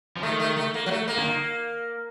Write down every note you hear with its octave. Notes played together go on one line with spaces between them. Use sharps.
F3
D#3 A3
A3
A3
A#3
F#3
A3
A#3
D#3